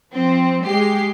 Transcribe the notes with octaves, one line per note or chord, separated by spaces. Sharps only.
F3 C4
G#3 G4 C7